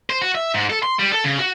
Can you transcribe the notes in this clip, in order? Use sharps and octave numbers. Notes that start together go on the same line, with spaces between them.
C5
F#4
E5
G#2
A4
C6
G3
A4
C#3
F#4